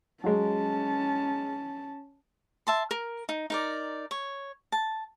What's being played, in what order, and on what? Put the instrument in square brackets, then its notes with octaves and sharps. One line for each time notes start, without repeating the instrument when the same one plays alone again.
[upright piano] F#3 G#3 [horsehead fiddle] C#4 A5
[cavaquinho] E5 A5 C6
A#4
D#4
D#4 A#4 D5
C#5
A5